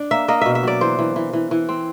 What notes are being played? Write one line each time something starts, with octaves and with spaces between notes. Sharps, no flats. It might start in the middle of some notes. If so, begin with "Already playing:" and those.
Already playing: D4
A#3 E5
A#3 D#5
B2 E5
E5
F#3 D5
E3 C5
E3
E3
E3
E3
C4